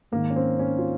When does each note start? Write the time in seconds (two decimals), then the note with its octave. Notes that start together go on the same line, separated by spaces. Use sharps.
0.12 G#2 D#3 A#3
0.30 C#4
0.36 C4
0.59 C#4
0.78 F4